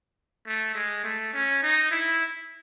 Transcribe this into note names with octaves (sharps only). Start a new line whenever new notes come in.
A3
G#3
A3
C#4
D#4
E4